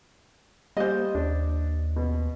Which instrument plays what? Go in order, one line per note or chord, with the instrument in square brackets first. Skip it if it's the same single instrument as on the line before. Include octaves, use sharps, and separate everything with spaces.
[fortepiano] G3 [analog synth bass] A#3 [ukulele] C5 D#5
[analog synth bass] D#2 [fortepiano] D4
[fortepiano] B2